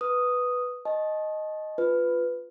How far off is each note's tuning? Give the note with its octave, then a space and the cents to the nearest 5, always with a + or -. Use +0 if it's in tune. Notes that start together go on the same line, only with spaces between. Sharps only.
B4 +0 D#6 +0
D#5 +0 A5 -35 C#6 -40
F4 +0 B4 +10